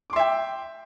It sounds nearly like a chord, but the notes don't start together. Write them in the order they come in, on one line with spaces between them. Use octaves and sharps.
D6 C6 E5 G5